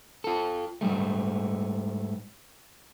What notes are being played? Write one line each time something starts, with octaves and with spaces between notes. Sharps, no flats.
F4 A4
G#2 C3 G3 A3